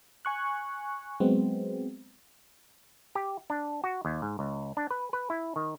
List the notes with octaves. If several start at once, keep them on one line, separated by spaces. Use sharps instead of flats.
G#5 C#6 F#6
F#3 G#3 B3 C4
G4
D4
F#4
D#2
G#2
C#2
D4
B4
B4
E4
D#3